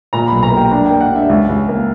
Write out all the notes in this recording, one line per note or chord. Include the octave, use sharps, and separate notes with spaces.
A#2 A#5
B5
B1
A#5
A#3 G5
D4 A#5
G5
A#3
F#5
D4 E5
C#2
C#2
A#3